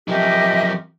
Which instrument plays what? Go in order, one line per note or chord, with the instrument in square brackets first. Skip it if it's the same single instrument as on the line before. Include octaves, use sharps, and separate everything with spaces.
[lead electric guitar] F#2 F3 [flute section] G4 D#5 E5